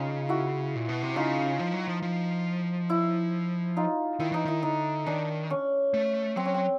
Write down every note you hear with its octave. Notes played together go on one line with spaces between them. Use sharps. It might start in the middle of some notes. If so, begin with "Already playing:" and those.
Already playing: C#3 D#4 F4
E4 F#4
A#2
B2
C3
C#3 D#4 F4
F3
F#3
F3
F3
E4
D#4 F4
D#3 E4
E3 D#4
D#3 E4
D3 D#4
D#3 D4
C#4
A3
F#3 C4
C#4
C4